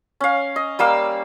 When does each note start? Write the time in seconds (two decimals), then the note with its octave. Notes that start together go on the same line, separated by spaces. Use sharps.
0.20 C#4 F5
0.56 D#5
0.79 G3 A#3 F5 E6